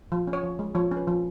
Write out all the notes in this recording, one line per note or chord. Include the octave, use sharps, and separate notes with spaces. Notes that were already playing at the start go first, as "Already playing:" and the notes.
F3
C#4
C#5
F3
G#3
F3 C#5
C#4
B4
F3